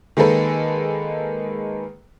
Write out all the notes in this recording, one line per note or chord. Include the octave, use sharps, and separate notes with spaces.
D#3 G#3 A#3 A4 B4